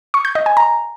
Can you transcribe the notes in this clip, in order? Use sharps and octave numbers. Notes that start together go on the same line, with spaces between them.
C#6
G6
D#5
G#5
A#5